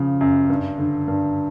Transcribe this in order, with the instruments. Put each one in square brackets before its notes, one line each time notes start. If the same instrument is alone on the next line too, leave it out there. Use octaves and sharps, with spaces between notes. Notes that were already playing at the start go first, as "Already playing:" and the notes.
Already playing: [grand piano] C#3 F3
F#2
G2
D3
G2